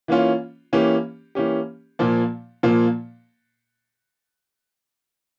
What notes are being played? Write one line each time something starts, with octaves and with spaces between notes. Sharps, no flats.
E3 A#3 C#4 F4
E3 A#3 C#4 G4
E3 A#3 C#4 G4
A#2 F3 A#3
A#2 F3 A#3